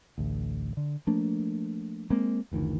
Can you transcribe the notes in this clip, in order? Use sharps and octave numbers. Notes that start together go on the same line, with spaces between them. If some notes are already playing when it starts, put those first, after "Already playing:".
A1 D2
D3
F3 A3 A#3 D4
G#3 A#3 C4
F#1 D2 D#3 E3